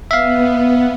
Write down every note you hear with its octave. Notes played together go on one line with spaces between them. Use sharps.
B3 E5 F5